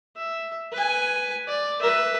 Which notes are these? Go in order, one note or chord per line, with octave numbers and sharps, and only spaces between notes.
E5
B4 G#5
D5
B4 E5